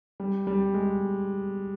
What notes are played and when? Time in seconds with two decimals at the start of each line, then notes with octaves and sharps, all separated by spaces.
0.20 G3
0.47 G3
0.74 G#3